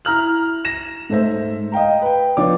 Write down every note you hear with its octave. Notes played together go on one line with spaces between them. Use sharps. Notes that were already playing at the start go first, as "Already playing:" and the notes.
E4 A#5 F6 F#7
A#6 E7
G#2 A3 C5 E5
D#5 F5 G5 A#5
B4 G5
F3 B3 D4 C#5 D6